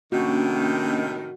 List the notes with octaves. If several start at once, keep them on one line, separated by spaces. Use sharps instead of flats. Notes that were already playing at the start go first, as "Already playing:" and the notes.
A2 C3 D#3 A#3 C#4 D4 F#4